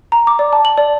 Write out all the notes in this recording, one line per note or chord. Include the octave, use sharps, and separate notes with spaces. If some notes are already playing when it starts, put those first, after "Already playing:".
A#5
D6
D5
A5
F#7
D5